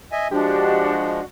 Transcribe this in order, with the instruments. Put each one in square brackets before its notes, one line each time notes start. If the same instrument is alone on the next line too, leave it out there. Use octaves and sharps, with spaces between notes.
[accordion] D#5 E5 G#5
[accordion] F3 G#3 [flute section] D4 F#4 D#5 [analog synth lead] G4